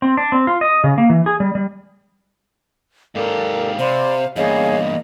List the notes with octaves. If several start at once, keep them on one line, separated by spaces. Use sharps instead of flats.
C4
D4
C4
F4
D#5
C#3
A#3
E3
G#4
G3
G3
G#2 G4 A4 A#4 D5 F5
C3 C5 D5 B5 C6
E2 G2 A#3 G#4 C#5 D#5 F5